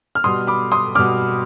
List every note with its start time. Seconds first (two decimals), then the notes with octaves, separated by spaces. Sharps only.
0.15 F6
0.24 B2 G3 C6 D#6
0.47 B5 D6
0.72 C6 D#6
0.95 B2 G3 D6 F6